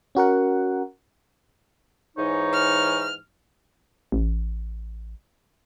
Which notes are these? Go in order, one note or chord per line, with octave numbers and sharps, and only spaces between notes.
C#4 F#4 A#4 F#5
G#2 E3 D#4 C#5
F6
A1